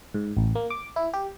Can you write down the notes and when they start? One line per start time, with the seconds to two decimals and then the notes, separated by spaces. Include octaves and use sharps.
0.14 G#2
0.37 A1
0.55 A#3
0.70 D6
0.96 E4
1.13 G4